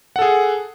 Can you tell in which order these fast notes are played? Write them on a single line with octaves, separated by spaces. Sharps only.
F#5 A4 G#4